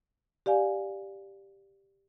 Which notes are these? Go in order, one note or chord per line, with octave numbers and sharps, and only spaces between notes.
G4 D5 F5 G#5